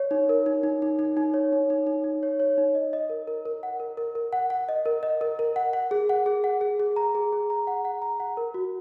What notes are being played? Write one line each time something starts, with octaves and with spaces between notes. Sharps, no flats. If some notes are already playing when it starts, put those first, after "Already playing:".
Already playing: C#5
D#4
A#4
D#4
D#4
D#4
D#4
D#4
C#5
D#4
D#4
D#4
D#4
C#5
C#5
D#4
D#5
D#5
A#4
A#4
A#4
F#5
A#4
A#4
A#4
F#5
F#5
D#5
A#4
D#5
A#4
A#4
F#5
F#5
G#4
F#5
G#4
F#5
G#4
G#4
A#5
G#4
G#4
A#5
F#5
F#5
A#5
F#5
A#4
F#4